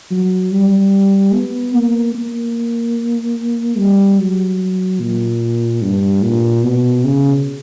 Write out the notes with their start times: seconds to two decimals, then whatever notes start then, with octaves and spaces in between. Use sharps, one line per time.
0.11 F#3
0.52 G3
1.33 B3
1.73 A#3
2.15 A#3
3.78 G3
4.19 F#3
5.00 A#2
5.82 G2
6.23 A#2
6.63 B2
7.04 C#3